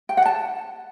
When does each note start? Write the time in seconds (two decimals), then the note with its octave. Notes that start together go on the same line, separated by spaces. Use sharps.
0.09 G5
0.17 F#5
0.26 A5